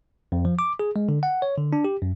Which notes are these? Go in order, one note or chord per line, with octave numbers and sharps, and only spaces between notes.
F2
F3
D6
G#4
G#3
D3
F#5
C#5
D3
D4
G4
F#2